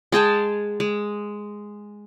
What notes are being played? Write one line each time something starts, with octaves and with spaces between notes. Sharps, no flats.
G#3 G#4 G5 A5
G#3